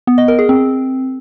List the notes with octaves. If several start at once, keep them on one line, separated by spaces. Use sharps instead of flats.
B3
D#5
A#4
G#4
C4